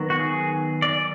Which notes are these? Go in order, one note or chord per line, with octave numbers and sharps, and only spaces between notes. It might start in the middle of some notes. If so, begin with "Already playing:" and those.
Already playing: D#3 F#3 B3
F#4
G#4
D5